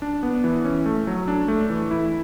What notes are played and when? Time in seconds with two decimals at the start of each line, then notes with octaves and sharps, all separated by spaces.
0.02 D4
0.23 B3
0.44 E3
0.65 C#4
0.86 A3
1.07 F#3
1.28 D4
1.48 A3
1.70 E3
1.91 E4